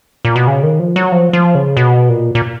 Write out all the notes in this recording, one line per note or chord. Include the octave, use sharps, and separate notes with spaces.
A#2
B2
C#3
D#3
F3
F#3
F3
F3
C#3
B2
A#2
A#2